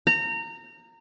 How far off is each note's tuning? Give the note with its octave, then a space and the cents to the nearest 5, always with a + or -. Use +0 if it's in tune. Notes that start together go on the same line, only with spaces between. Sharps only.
A#5 -25